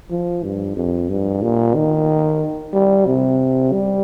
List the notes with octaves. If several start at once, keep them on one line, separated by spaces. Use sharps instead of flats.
F3
G2
F2
G2
A#2
D#3
G3
C3
G3